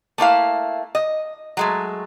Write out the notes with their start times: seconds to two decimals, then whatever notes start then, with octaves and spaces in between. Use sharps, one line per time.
0.18 A3 A#3 E4 F5
0.95 D#5
1.57 F#3 G#3 A3